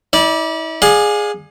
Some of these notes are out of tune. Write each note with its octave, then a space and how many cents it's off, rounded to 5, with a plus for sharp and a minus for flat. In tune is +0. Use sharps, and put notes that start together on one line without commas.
E4 -40 D5 +0
G#4 +0 D5 +30 F5 +35